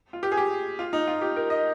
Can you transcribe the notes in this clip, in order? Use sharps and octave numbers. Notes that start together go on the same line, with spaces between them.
F4
G4
G#4
G4
F4
D#4
F4
G4
A#4
D#5